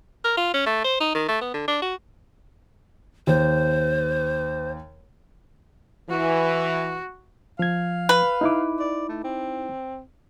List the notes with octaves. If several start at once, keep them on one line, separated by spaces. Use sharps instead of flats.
A#4
F4
C#4
A3
C5
D#4
D#3
A3
B3
D3
D4
F#4
D#2 C5
E3 F#4
F3 F5 G#6
B4
D#4 E4 D6
D5
A3
C4